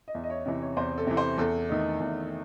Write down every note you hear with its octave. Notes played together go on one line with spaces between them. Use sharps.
D#5
E2 E5
D#5
C#5
C3 E3 D#5
C#5
E2 C5
A4
C3 E3
C5
E2 A4
D#3 A3 D#4
E2